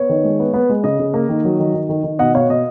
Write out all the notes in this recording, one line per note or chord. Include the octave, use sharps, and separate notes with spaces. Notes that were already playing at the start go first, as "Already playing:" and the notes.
Already playing: B3 C#5
D#3
G#3
B3
B3
G#3
C#3 D#5
C#3
A#3
D#3
F#3
D#3
D#3
D#3
D#3
B2 D#5 F#5
B2 C#5 F5
B2 D#5